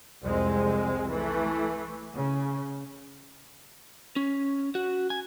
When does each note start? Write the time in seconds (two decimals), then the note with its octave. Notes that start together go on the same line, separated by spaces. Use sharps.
0.25 C2 F2 G#3 C4
1.13 E3 A3
2.14 C#3
4.16 C#4
4.75 F#4
5.10 G#5